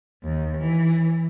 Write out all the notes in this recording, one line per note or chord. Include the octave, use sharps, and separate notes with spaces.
D#2
E3